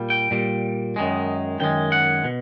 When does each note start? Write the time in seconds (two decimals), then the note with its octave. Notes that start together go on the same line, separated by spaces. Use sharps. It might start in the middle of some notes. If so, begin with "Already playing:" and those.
Already playing: A#2 G3
0.10 G5
0.31 A#2 G3
0.96 F#2 D#3 G#3
1.60 F#2 D#3 G#3 G5
1.92 F#5
2.24 B2